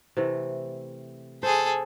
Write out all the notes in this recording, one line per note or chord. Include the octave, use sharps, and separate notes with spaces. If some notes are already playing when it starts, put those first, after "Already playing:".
C3 E3 A3
G#4 A4 C5